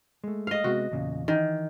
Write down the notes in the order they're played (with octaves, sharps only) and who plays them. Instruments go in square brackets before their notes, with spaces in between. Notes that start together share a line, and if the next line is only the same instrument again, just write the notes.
[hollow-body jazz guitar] G#3 A3
[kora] D#5 F5
[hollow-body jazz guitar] C3 G#3 B3 [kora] F#4
[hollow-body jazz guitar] E2 A#2 C#3
[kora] D#3 [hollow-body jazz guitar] E3